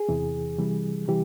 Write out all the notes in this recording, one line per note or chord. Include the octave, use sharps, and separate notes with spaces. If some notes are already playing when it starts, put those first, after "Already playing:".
Already playing: G#4
E2 C3 E3
C3 E3 G3
C3 E3 G3 G4